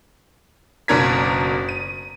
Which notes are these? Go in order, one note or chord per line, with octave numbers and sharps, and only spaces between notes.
F#1 B2 D4 A#4 G#6 B6
D#7